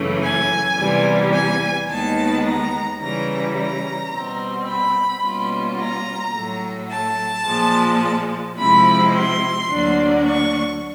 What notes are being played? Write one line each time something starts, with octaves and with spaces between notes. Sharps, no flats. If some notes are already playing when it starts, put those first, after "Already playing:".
Already playing: F#2 C#3 E3 A3
G#5
E2 C3 E3 G3
G#5
D#2 D#3 G#3 B3 A5
A#5
C#3 E3 G3 A#5
A#5
B2 G3 C4
B5
B2 G3 A#3 C#4 F4
A#5
A2 F#3 A3
A5
A#2 F3 G#3
C3 F3 G#3 C4 E4 B5
C6
D2 D3 F#3 A#3 D4
C#6